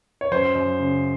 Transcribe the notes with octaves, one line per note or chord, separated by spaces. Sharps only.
C#5
F#2 C5
F#2
C#3